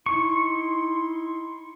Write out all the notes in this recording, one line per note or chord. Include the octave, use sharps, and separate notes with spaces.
D#4 E4 C6 C#6